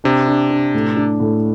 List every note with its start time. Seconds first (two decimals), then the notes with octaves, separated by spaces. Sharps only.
0.04 C3 D4
0.28 D4
0.50 D4
0.74 A2
0.97 D4
1.20 A2